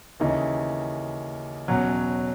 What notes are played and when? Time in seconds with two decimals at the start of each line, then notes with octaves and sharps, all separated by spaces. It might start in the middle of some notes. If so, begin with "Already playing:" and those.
0.20 D#2 C#3 E3 D#4
1.68 E2 B2 F#3 C#4